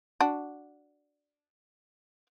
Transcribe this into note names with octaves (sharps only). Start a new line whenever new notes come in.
D4 F#4